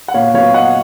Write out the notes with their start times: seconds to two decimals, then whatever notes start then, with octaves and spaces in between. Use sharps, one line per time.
0.08 F#5
0.14 A#2 C#5 F5
0.34 F#3 B3 C#5 F5
0.54 A#2 D#5 F#5